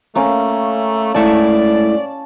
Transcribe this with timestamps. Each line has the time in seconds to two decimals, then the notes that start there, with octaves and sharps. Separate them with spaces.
0.15 A3 A#3 C#4
1.15 G#2 A3 E4 D5 A5